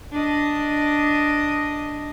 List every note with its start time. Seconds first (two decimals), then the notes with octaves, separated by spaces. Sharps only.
0.12 D4 D#5